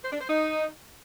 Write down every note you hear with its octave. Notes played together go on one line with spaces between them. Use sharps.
C5
D4
C5
D#4